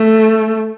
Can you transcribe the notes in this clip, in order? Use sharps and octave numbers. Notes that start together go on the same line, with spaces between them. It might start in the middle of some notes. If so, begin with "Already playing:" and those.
Already playing: A3